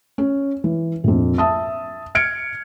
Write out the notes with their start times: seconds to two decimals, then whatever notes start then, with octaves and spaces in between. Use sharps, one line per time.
0.18 C#4
0.64 E3
1.04 A#1 F2
1.38 E5 A5 D#6
2.15 F6 G#6 C#7 D7